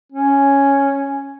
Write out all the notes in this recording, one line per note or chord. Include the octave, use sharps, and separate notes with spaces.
C#4